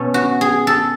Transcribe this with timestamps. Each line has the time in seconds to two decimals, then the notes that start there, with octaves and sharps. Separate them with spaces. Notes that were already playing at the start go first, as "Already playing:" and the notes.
Already playing: B2 A3 C#4
0.14 F#4
0.41 G#4
0.67 A4